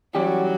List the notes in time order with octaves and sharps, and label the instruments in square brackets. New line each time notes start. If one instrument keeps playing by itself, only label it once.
[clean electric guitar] E3 G3 C#4 G4 D5 [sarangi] F#3